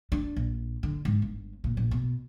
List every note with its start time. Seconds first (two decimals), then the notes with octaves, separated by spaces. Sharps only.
0.12 D4
0.36 A#1
0.83 D3
1.05 G#2
1.22 G1
1.64 A#2
1.77 A#1
1.91 B2